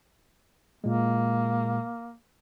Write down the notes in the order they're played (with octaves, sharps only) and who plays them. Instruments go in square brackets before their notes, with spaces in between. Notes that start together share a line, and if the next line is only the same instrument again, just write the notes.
[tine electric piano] A#2 G#3 [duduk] A#3